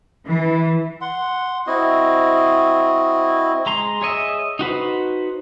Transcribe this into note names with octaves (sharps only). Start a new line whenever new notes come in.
E3
F#5 C6
C4 E4 F#4 D#5
G#3 A#5 C6
G#4 C#5 D#5 E5
D#4 F#4 B4 C5